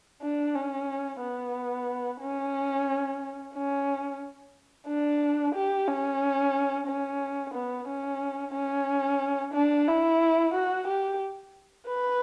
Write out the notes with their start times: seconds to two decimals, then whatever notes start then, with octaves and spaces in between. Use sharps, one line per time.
0.22 D4
0.55 C#4
1.21 B3
2.21 C#4
3.54 C#4
4.87 D4
5.55 G4
5.88 C#4
6.87 C#4
7.54 B3
7.88 C#4
8.54 C#4
9.54 D4
9.88 E4
10.54 F#4
10.87 G4
11.87 B4